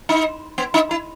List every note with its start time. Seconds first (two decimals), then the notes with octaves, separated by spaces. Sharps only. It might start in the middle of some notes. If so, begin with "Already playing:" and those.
0.09 D#4
0.58 B3
0.74 D#4
0.91 E4